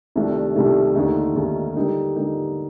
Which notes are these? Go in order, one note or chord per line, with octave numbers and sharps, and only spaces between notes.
C2 C3 D#3 A3 D4
C2 C3 D#3 A3 D4
D#2 D3 A3 D#4
D#2 D3 A3 D#4
D3 G3 A#3 D#4 A4
D3 G3 A#3 D#4 A4